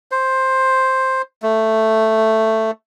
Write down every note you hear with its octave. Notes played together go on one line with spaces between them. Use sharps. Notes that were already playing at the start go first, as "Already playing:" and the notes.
C5
A3